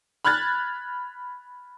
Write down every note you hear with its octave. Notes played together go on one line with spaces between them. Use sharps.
B5 F6 F#6 G#6 A6